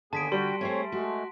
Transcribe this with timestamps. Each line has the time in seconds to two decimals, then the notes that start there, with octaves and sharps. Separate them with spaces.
0.13 D#2 D3 B3 G#4 A5 B6 D7
0.32 G3 F#4 G5 C6
0.61 A3 C4 G#4 C5 C#5
0.92 G#3 A3 F#4